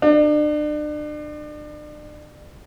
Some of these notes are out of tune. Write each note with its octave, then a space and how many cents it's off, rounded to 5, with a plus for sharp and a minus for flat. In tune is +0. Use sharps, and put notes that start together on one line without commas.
D4 +35